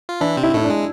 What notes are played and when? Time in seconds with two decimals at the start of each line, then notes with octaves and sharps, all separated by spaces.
0.09 F4
0.21 E3 D4 E4
0.37 C3 C4
0.43 E4
0.54 A2 A3 E4
0.64 D4
0.70 G#3